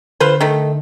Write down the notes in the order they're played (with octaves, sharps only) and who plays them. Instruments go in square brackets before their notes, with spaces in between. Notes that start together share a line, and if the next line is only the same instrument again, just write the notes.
[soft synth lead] D3 [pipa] F4 B4 C5
[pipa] D#3 A3